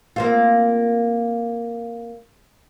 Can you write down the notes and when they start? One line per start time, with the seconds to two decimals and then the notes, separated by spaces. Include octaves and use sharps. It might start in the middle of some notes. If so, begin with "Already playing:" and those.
0.16 A#3 C4 F4